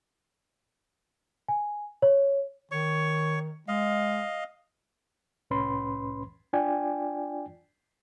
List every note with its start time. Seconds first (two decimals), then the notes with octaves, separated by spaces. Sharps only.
1.48 G#5
2.02 C#5
2.71 D#3 C#5 C#6
3.68 G#3 D#5 F5
5.50 C2 A2 C#4 B4 B5 C6
6.53 D4 F4 D5 G5 G#5